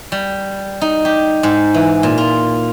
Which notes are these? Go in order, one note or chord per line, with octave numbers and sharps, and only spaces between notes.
G3
D#4
G4
G#2
E3
A#2
F4